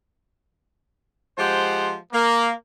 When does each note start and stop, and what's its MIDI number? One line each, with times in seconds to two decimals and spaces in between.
1.38 1.96 53
1.38 1.96 56
1.38 1.96 67
1.38 1.96 72
1.38 1.96 78
2.13 2.52 58